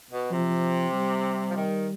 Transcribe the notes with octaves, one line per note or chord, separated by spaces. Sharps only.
B2
C3 F3
G3
F3
D#3